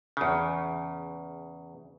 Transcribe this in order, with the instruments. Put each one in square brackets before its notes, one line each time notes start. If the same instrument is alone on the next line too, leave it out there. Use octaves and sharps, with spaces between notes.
[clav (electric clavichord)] E2 C#3